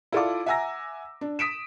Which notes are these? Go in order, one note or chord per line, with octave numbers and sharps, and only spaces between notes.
E4 F4 A4 D5 F5 D6
E5 F#5 G#5 A#5 E6 A#6
D4
D#6 B6 D7 E7